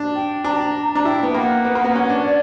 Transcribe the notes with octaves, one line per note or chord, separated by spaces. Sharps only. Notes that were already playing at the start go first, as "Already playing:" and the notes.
Already playing: D4
G5
D4 A#5
D4
E4 G5
B3
A#3 F#5 G5
B3
A#3
B3
C#4
D4
D5